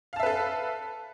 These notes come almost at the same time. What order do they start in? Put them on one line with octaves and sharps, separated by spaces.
F5 A5 E5 B4 A4